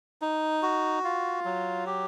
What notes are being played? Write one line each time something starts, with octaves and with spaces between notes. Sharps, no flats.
D#4
F#4
F4
F#3
G4